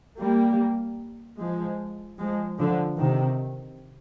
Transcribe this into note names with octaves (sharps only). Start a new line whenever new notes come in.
G3 A#3
F3 G#3
F3 G#3
D3 F3
C3 D#3